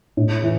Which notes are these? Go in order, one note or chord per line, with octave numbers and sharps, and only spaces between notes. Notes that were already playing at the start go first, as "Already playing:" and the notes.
A2
E3